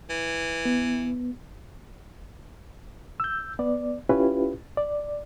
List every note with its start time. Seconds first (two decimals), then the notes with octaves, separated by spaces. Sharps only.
0.10 E3
0.65 B3
3.20 E6 G6
3.59 B3 D5
4.09 C#4 E4 F4 G4 B4
4.77 D5